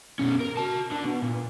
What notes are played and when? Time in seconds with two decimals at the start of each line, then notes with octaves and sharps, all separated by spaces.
0.19 B2 C#4
0.40 A#4
0.57 F#4 A5
0.92 D3
1.05 B2
1.23 A#2